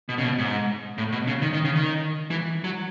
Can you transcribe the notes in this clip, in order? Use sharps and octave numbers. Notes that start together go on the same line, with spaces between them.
B2
C#3
B2
G#2
A2
B2
C#3
D#3
D#3
C#3
D#3
E3
F#3